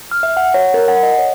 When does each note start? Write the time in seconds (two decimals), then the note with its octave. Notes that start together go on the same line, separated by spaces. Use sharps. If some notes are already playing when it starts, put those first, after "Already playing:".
0.11 F6
0.23 E5
0.37 F#5
0.54 C#5
0.74 A#4
0.88 F#5
1.03 D#5
1.19 C#5